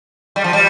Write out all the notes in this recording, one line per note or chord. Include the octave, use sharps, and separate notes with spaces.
G3
F3
G3